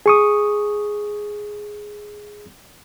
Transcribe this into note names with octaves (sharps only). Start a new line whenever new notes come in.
G#4 C#6 D#6